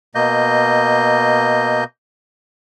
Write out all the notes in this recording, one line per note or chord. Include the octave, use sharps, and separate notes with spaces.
B2 A#3 D#5 G6